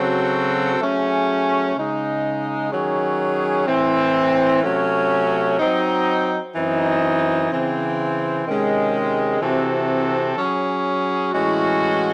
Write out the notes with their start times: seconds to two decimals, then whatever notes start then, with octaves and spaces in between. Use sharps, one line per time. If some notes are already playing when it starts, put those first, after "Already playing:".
Already playing: C#3 F#3 C4 F#4 A4
0.80 F#3 A3 C#4 G#4
1.76 C#3 G#3 D#4
2.72 D#3 F#3 C#4 G#4
3.67 A2 E3 C4
4.62 C3 F#3 A3 C#4
5.59 F#3 C4 D#4
6.55 F#2 E3 C4 D#4
7.50 C#3 E3 C4
8.46 C3 D#3 G#3 C#4
9.41 C3 E3 C4 F#4 A4
10.37 F#3 C#4 G#4
11.32 A2 E3 G#3 C#4 F#4